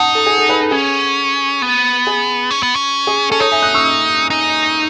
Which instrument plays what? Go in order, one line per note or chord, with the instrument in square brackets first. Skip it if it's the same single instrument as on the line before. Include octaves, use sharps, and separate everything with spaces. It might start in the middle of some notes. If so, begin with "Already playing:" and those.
Already playing: [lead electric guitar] D#4 [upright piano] F#5 A5
[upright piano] A4
G#4
A4
G#4 B4
A4
[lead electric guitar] C#4 [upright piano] G#4
[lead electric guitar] B3
[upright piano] G#4
[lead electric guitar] C#4
B3
C#4
[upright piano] G#4
[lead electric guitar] C#4 [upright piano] A4
[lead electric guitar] D#4 [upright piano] A4 C#5
[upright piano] E5 G#5
D#6 F#6
C#6 E6
[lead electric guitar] D#4